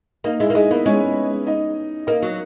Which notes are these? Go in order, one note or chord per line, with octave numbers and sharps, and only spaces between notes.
A#3 D#4 D#5
G#3 E4 E5
A#3
G#3 D#4 D#5
A#3 B3 B4
G#3 C#4 C#5
D#4 D#5
A#3 D#4 D#5
F#3